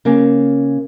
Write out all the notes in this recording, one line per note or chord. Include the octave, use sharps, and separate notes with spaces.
C#3 A#3 C#4